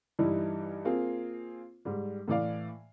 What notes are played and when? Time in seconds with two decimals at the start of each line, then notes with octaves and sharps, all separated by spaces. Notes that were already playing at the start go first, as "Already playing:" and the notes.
0.19 G2 E3 G3 D#4 E4
0.85 A#3 C4 F4 G#4
1.85 G#2 G3
2.28 A2 E3 D5 F5